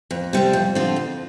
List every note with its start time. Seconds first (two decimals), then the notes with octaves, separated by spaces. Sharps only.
0.11 F2
0.33 C3 G3 C4
0.53 F2
0.75 D3 F3 C4 F4
0.96 F2